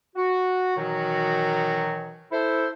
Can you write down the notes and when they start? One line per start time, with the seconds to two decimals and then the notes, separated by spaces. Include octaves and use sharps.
0.16 F#4
0.77 B2 D#3 E3 F#3 D#4 F#4
2.32 E4 A4 C5